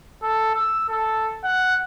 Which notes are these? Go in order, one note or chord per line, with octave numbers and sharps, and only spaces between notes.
A4
E6
A4
F#5